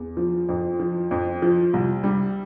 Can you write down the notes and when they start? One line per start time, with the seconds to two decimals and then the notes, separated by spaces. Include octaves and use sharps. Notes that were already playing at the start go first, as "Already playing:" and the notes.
Already playing: E2
0.17 F3
0.49 F2
0.80 F3
1.11 F2
1.42 F3
1.74 C2
2.04 G3